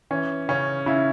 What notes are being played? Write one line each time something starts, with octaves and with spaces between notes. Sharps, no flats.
E3 C#4
C#3 C#4
C#3 E4